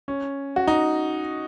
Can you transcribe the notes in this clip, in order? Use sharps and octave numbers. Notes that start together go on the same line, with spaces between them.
C#4
F#4
D#4